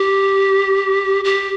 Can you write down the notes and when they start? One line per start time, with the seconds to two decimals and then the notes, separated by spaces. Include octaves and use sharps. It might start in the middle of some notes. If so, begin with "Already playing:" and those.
Already playing: G4
1.25 G4